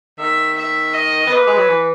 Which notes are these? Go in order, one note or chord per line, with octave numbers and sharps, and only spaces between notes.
D#3 E5
E5
D#5
B3
A#3 B4
G#3
F#3
E3